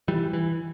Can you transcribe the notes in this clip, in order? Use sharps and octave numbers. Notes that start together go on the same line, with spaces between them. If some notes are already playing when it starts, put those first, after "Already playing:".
E3 G3
E3